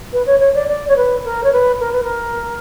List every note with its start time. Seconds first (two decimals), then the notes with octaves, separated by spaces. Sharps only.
0.13 B4
0.26 C#5
0.40 C#5
0.55 D5
0.68 D5
0.88 C#5
0.97 B4
1.24 A#4
1.44 C#5
1.52 B4
1.80 A#4
1.92 B4
2.03 A#4